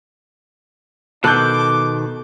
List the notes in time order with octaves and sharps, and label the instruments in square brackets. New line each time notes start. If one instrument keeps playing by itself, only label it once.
[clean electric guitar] B2 D#3 [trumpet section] D#4 D6 [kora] A4 [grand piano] F#6 G6